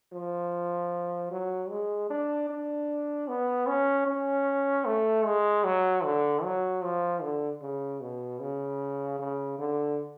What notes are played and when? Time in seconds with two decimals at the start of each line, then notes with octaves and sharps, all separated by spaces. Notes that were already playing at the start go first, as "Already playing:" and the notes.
0.13 F3
1.31 F#3
1.70 G#3
2.10 D4
2.50 D4
3.28 B3
3.67 C#4
4.07 C#4
4.86 A3
5.25 G#3
5.64 F#3
6.04 D3
6.43 F#3
6.83 F3
7.22 D3
7.62 C#3
8.01 B2
8.40 C#3
9.19 C#3
9.59 D3